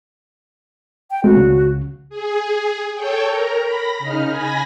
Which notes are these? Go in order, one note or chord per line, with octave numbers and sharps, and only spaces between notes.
G5
G#3 A3 C4 F#4
C#2 C#3
G#4
A4 C#5 G5
A#4 A#5
B5 A#6
C#3 D#4 F6
G#5 B5 A#6